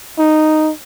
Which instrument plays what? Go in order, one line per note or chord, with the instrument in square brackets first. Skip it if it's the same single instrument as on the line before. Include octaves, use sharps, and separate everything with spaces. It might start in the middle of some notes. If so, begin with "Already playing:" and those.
[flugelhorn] D#4